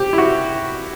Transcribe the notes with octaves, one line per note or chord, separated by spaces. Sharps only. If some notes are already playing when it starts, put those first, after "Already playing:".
Already playing: G4
E4
F#4